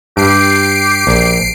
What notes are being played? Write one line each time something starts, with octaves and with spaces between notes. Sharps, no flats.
G2 G4 C7 D7
A#1